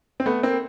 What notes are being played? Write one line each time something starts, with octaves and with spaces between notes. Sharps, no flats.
C4
A3 B3
A#3 C4